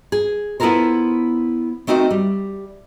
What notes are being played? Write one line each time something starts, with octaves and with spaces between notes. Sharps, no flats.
G#4
B3 E4 F4 A4 A#4 C5
A3 C4 D#4 F#4 A#4
G3